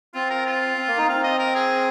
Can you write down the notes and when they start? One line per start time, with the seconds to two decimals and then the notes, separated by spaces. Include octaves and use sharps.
0.14 C4 F4
0.30 A#4
0.46 F4
0.77 C4
0.87 A#3
0.97 D#4
1.08 C4 F5
1.23 D#5
1.39 A#4
1.55 G#4